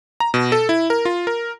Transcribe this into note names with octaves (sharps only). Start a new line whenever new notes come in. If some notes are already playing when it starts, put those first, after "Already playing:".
A#5
B2
A4
E4
A#4
F4
A#4